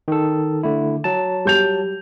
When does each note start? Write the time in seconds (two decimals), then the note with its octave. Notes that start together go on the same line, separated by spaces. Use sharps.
0.08 D#3 A4
0.63 D3 A3 E4
1.04 F#3 A5
1.45 G3 G6 F7